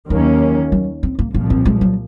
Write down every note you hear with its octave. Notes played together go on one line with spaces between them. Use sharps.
D#2 D#3 F#3 A#3 C#4
F#3
C4
A#3
C2 A#2 F3 A#3
C4
G#3
F#3